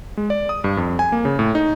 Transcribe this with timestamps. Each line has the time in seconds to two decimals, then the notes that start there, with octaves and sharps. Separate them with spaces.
0.17 G#3
0.30 D5
0.49 D#6
0.64 G2
0.77 F2
0.99 G#5
1.12 A#3
1.25 C#3
1.39 A2
1.55 D#4